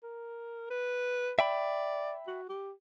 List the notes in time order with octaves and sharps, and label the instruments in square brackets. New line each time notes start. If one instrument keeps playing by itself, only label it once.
[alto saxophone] A#4
B4
[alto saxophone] D5 [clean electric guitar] E5 G5 B5
[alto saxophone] F#4
G4